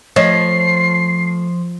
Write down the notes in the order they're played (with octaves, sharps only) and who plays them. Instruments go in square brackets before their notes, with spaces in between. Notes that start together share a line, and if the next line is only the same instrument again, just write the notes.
[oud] F3 [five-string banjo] A3 C#5 D#5 [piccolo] C7